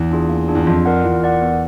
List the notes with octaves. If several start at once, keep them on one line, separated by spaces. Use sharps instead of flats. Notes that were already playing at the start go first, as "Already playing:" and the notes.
Already playing: E2
D4 F4 G#4
A#3
D4 F4 G#4
E2
F2 F4
A#4 D5 F#5
E2 F4
A#4 D5 F#5
B3